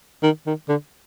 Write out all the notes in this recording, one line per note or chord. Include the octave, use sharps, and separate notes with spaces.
D#3
D#3
D3